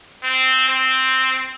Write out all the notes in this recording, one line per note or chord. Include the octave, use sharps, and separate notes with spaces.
C4
C4